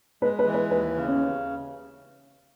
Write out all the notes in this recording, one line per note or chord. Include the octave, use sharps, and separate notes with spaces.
G#3 B4
B4
E3
B4
D#2 B4
C#3
C#4